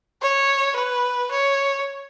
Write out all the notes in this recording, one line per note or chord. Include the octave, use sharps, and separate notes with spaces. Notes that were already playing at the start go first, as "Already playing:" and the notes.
C#5
B4
C#5